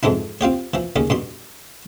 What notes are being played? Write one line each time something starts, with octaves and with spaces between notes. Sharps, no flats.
F2 G#2 E3 D4 E4
C4 F4 G4 C#5
E3 F3
D#2 C#3 C#4
G2 B2 C6